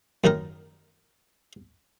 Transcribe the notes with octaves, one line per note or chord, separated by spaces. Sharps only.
F#2 D#3 D#4 A#4